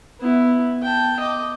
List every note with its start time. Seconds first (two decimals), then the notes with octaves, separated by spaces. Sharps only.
0.20 B3 E4
0.83 G5 A5
1.20 D#5 D6